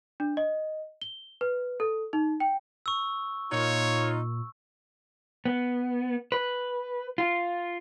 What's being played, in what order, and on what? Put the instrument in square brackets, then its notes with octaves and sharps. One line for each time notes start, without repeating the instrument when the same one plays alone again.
[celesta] D4
D#5
G7
B4
A4
D#4
G5
[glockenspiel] C#6 E6
[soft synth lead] A#2 [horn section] D#4 F4 [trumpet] C#5
[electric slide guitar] B3
B4
F4